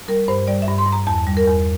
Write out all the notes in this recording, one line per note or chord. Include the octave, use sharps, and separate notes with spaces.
G3 A#4
G2 C5
G3 D5
E5
G2
C6
G2
A#5
E2 A5
G3
A#4
E2